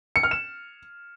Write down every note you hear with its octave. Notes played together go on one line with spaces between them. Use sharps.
C#7
F6
E7